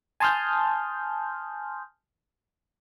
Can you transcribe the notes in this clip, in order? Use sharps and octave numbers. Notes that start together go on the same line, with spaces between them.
G#5 A5 C6 D#6 F6 G6